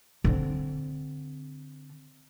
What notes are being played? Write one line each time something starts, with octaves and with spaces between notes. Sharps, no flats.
D3 C4